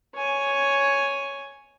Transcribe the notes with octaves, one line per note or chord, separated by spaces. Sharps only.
C#5 G#5